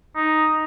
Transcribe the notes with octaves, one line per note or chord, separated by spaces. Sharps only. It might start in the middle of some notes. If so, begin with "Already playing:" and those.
D#4